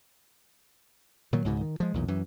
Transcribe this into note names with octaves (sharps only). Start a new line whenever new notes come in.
A#2 D#3 F#3
C#2 G#2 B2
D#3
F3 G#3
B1 E2 A#2
F#2 E3